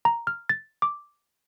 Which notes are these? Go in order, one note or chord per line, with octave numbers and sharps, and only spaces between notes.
A#5
F6
A6
D6